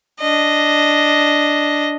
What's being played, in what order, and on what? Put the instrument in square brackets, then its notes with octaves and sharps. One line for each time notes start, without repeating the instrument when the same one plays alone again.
[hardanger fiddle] D4 D#5